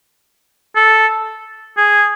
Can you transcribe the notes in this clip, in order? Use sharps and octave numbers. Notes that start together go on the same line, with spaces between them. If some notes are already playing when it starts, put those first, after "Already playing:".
A4
G#4